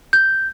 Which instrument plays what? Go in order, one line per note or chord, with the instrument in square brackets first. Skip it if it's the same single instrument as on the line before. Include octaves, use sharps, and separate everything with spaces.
[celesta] G6